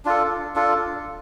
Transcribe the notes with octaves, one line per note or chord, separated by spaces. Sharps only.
D4 F4 A4
D4 F4 A4